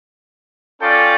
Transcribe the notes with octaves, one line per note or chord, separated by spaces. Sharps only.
C#4 F4 A4 D5 G5